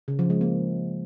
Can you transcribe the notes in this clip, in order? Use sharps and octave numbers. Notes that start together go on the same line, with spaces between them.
C#3
F3
G#3
A#3